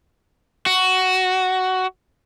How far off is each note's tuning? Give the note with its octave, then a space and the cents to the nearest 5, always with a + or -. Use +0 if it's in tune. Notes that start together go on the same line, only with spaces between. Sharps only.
F#4 +10